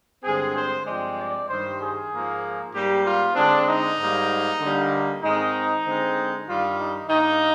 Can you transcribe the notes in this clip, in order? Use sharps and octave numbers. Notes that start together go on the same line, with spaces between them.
G2 D3 G#3 C4 G#4
C5
G2 F3 G#3 C4 D5
D5
G2 D#3 G3 C5
G#4
G#2 F3 A#3
G#2 G3 A#3 G4
F4
D3 G#3 C4 D4
D#4
G#2 G3 A#3
D3 G3 A#3
G#2 D#3 G#3 C4 D#4
D3 G#3 C4
G2 D#3 G3 F4
D#4
G2 D#3 A#3 D#4